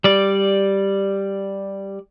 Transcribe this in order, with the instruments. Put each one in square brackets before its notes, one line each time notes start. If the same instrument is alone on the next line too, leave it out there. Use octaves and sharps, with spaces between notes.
[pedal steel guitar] G3 D5